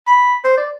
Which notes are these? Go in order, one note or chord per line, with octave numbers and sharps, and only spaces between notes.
B5
C5
D5